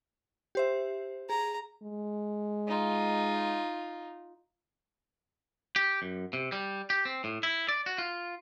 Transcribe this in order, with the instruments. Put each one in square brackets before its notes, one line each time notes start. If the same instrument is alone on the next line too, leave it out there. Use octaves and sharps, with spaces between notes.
[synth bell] G4 C5 E5
[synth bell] G#4 [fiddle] A#5
[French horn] G#3
[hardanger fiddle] D#4 F4
[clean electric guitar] G4
F#2
C3
G3
G4
C4
A2
E4
D5
F#4
F4